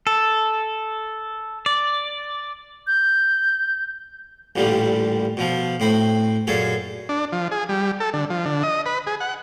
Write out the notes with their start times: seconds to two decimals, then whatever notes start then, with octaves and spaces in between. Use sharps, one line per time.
0.07 A4
1.66 D5
2.87 G6
4.56 A1 A#2 D3 G3
5.37 B2 F3
5.80 A2 C4 B5
6.47 F#2 A#2 G#4 A4
7.09 D4
7.32 F3
7.51 G#4
7.69 G3
8.00 A4
8.13 D3
8.30 F3
8.45 D3
8.63 D#5
8.86 B4
9.07 G#4
9.20 F#5